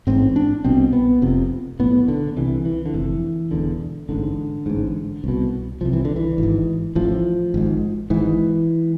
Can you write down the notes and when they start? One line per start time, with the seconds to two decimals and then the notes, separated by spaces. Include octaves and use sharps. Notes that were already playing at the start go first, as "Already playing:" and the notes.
0.07 A1 G#2 C4
0.36 D4
0.64 C2 B2 C4
0.93 B3
1.22 F1 F2 C3
1.79 B1 A2 B3
2.08 D3
2.36 C2 C3 E3
2.65 E3
2.86 D3
2.94 F1 F2 C3 E3
3.51 E1 E2 D3
4.09 A1 G#2 D3
4.66 A1 G#2
5.24 C2 B2
5.81 C2 C3 F3
5.93 E3
6.05 D3
6.16 E3
6.38 G#1 G#2
6.95 A1 A2 F3
7.54 G#1 G#2
8.10 G#1 G#2 E3